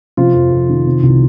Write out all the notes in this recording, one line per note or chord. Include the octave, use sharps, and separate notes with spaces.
C3 F3 F4
F2
F2
D#3
C3
C2